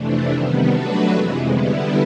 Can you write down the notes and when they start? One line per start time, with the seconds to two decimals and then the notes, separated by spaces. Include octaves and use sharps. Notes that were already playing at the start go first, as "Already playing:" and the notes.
Already playing: F2 C3 E3 A3 D4
0.29 C3 D#3 G3 B3
0.69 F#3 A3 D4 F#4 B4
1.09 F2 C3 E3 G#3
1.49 D3 G3 B3 E4